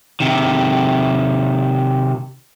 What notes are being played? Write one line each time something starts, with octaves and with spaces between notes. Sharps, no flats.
C3 D#3